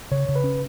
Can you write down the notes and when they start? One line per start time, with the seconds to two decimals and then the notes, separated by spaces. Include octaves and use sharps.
0.11 C#3 C#5
0.29 C#3
0.36 B4
0.44 C#4